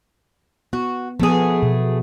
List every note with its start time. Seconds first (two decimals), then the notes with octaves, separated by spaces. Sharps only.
0.73 B3 F#4
1.20 F3 A3 B3 G#4
1.63 B2